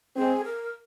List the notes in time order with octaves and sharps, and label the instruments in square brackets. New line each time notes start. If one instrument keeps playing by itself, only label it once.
[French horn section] G#3 C4 [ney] G#4
[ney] A#4